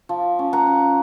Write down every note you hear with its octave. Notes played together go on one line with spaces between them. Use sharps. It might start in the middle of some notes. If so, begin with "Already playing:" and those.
F3
C#4
F#5 A#5
C#4